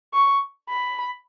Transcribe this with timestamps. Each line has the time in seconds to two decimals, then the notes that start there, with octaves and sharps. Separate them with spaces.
0.14 C#6
0.69 B5